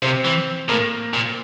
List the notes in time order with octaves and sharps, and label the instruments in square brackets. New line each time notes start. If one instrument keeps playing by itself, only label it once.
[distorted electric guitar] C3 [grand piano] C4 C5
[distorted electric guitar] E3
[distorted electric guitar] A2 [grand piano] A#3 A#4
[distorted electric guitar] A#2